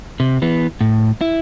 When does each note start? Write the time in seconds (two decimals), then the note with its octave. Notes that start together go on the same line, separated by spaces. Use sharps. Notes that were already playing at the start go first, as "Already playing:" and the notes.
0.20 C3
0.42 E3 B3
0.81 A2
1.21 E4